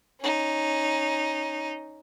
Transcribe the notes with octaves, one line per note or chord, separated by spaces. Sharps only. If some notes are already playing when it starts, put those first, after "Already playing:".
C#4 D#4